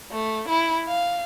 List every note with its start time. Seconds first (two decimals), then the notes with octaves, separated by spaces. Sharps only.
0.12 A3
0.48 E4
0.88 F5